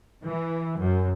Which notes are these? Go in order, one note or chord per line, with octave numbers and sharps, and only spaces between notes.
E3
F#2